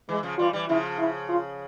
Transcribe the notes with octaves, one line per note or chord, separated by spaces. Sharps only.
E3 G#3
C#3 F3
E3 G3 F4
E3 G3
C#3 F3 E4
E4
F4